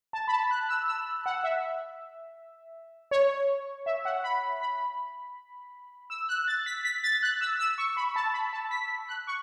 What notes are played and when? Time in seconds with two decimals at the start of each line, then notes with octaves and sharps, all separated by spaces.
0.13 A5
0.28 B5
0.32 A5
0.51 F#6
0.69 E6
0.88 E6
1.26 F#5
1.44 E5
3.11 C#5
3.86 E5
4.05 F#5
4.24 B5
4.61 B5
6.10 E6
6.29 F#6
6.47 A6
6.66 B6
6.85 B6
7.04 A6
7.23 F#6
7.41 E6
7.59 E6
7.78 C#6
7.97 B5
8.16 A5
8.34 B5
8.53 A5
8.71 B6
9.09 F#6
9.27 C#6